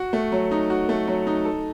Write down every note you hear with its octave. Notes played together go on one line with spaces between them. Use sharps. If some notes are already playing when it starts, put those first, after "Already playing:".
Already playing: F#4
A3
F#3
D#4
F#4
A3
F#3
D#4
A4